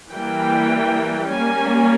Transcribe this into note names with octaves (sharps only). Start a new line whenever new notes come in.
E3 G3 A#3 G5
G3 A#3 C#4 G#5